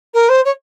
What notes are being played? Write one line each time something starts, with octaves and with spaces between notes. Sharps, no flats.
A#4
C5
C#5